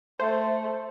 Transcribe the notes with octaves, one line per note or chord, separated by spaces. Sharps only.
A3 C5